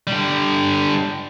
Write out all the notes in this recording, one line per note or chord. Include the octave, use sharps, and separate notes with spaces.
D3 G3